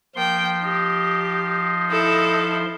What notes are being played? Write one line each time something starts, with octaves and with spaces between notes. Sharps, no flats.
F3 A#3 G5 C6
D#4 G4
E4 A4